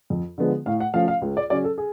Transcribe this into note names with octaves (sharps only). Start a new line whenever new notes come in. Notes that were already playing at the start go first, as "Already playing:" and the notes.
F2
D3 F3 G#3 B3
A2 F5
F#5
F3 A3 C#4 F5
F5
C#2
D5
C#3 F#3 C#4 D5
A4
G#4